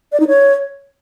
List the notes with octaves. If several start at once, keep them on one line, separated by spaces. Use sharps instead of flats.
D5
D#4
C#5